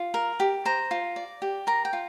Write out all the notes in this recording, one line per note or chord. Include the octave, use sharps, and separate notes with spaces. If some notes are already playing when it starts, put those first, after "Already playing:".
Already playing: F4
A#4
G4
C5 A#5
F4
D5
G4
A#4 A#5
G5
F4